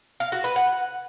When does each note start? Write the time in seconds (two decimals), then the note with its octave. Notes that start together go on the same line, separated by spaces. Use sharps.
0.20 F5
0.32 F#4
0.44 B4
0.56 F#5